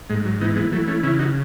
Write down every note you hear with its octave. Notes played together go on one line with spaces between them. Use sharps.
G#2 G#3
F#3
E3 B3 D#4
G#3 B3
E3 F#3 A3
A3 C#4
C#3 C#4 E4
D#4 F#4